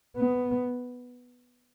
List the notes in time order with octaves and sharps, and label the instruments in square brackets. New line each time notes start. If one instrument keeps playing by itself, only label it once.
[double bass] B3